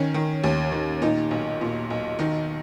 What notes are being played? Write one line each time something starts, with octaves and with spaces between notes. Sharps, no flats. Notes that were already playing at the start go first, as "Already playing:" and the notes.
Already playing: D#3 C#4
D#3
D#2
D#3
A#2 D#4
B1
A#2
B1
D#3 D#4